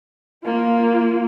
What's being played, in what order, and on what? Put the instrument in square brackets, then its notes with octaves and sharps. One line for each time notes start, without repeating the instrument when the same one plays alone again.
[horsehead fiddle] A#3 F4